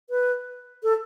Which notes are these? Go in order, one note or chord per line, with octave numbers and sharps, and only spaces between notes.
B4
A4